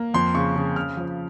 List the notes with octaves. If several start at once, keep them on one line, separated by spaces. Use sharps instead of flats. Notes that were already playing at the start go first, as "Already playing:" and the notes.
Already playing: A#3
F2 C6
C#3 C#6
C#3
C#3 F6
F3